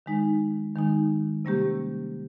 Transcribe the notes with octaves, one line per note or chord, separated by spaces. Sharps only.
D#3 G#3 D#4
D#3 G#3 D#4
C3 G3 A#3 C#4 G4